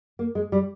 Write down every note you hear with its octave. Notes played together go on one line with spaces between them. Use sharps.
A#3
G#3
G3